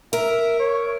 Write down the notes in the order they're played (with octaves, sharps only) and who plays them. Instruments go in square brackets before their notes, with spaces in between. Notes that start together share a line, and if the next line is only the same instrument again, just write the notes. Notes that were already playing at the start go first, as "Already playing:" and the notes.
[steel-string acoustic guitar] A#4 [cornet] E5
[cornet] C#5